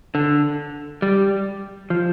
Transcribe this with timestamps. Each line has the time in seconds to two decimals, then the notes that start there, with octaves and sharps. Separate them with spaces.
0.15 D3
1.02 G3
1.90 F3